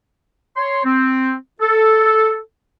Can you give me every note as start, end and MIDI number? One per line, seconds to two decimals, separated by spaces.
0.57 0.80 73
0.57 0.80 84
0.85 1.33 60
1.61 2.38 69